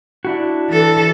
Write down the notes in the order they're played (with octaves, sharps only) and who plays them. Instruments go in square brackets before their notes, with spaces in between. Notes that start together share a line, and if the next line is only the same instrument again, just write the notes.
[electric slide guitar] D4 E4 F#4
[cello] E3 A4